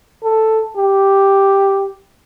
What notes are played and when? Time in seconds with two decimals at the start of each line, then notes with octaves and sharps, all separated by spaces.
0.24 A4
0.77 G4